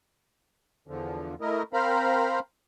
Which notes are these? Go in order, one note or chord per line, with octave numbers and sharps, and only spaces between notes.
E2 D3 F3
A3 E4 A#4 D#5
C4 A#4 C5 F5 A#5 B5